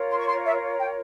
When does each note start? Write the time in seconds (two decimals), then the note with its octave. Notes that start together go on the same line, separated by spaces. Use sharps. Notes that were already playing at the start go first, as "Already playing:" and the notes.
Already playing: F4 A#4 C#5
0.09 C6
0.19 C#6
0.26 C6
0.44 E5
0.79 G5